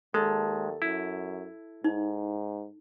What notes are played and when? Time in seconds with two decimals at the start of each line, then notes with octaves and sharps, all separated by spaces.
0.14 D#2 G#3 A4
0.82 F#2 E4
1.84 G#2 D#4